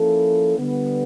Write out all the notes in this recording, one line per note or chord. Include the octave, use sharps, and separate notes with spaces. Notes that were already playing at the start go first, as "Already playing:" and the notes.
Already playing: F3 A#3 C#4 E4 A4
D3 G3 B3